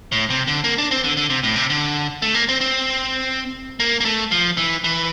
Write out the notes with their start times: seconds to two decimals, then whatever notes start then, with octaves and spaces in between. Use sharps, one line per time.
0.12 A2
0.30 C3
0.47 D3
0.64 A#3
0.78 D4
0.91 C4
1.04 D3
1.17 D3
1.30 C3
1.43 A2
1.56 C3
1.70 D3
2.22 A3
2.34 A#3
2.49 C4
2.61 C4
3.80 A#3
4.00 A#3
4.05 A3
4.31 F3
4.57 E3
4.84 E3